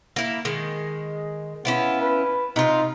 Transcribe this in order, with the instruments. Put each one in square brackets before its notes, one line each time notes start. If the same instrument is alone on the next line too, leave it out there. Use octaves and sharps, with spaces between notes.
[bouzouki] A#3 E4
D#3 G#3
[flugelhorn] B3 [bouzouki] C#4 E4 F4
[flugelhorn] B4
[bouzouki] C3 F4 [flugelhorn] D#4